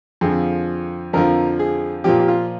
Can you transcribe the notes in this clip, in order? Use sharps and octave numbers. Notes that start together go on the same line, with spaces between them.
F2 D3 F3 G#4
F2 D3 F3 A#4
G#4
A#2 F3 G4
G4
F4